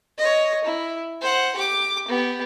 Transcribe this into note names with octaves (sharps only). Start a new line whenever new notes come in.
C#5 D#5
E4
C5 F#5
G4 D6
B3 G4